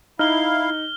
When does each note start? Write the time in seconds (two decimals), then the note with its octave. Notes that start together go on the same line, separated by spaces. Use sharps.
0.19 D#4 E4 F5 F6 G7